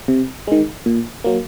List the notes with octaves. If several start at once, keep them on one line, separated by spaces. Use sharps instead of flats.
C3
D#3 G#3
A#2
F#3 A#3